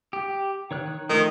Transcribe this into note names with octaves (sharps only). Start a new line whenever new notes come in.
G4
D#3 C#5 F#6
D#3 F3 A3